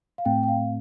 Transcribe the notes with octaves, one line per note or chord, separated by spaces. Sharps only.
F5
A2 A3 C4 G5
G5
F5